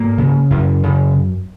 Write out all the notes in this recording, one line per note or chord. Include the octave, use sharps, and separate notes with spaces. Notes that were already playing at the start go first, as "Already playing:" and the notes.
Already playing: G#2 A#3
C#3
F#2
C#3